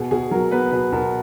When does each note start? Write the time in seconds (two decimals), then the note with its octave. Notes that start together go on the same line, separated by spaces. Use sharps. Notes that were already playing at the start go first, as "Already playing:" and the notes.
Already playing: B2 G#4
0.11 B2 G#4
0.31 F#3 A#4
0.51 B3 B4
0.71 B2 B4
0.92 B2 A#4